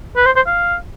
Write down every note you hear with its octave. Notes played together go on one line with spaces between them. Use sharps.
B4
C5
C5
F5